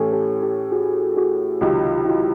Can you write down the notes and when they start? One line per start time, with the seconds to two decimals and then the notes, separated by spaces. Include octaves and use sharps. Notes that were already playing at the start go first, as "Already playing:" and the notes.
Already playing: A2 E3 A3 C#4 G4 A4
0.13 G4 A4
0.42 G4 A4
0.72 F#4 G#4
1.17 F#4 G#4
1.61 C#2 C3 D#3 F#3 F4 G4
1.98 G4
2.05 E4 F#4